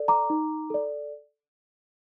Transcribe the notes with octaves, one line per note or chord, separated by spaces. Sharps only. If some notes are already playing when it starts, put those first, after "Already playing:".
Already playing: A4 D5
A#5 D6
D#4
A4 D5